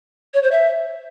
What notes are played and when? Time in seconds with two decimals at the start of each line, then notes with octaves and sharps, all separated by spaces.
0.34 C#5
0.43 C5
0.51 E5